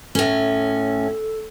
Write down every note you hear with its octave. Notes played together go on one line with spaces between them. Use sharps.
A2 C#4 A4